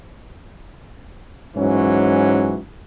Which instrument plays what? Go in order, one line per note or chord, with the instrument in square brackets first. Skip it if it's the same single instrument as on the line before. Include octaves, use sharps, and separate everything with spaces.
[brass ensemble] G#2 E3 F#3 C#4